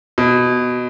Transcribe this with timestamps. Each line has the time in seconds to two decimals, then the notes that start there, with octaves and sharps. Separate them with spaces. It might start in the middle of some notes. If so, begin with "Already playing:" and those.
0.18 B2